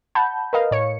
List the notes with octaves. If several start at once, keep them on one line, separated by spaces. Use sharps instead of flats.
F#5 A5 B5 G6
A#4 B4 D#5 F5
A2 C#5 C#7